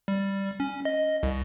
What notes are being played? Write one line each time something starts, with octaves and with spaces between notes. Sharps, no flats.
G3
C#4
D#5
C2